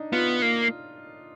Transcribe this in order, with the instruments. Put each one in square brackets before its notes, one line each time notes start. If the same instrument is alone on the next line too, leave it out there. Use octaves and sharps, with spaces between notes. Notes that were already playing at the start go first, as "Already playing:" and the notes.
Already playing: [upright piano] D4 D#4
[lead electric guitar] B3 [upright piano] F4
[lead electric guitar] A#3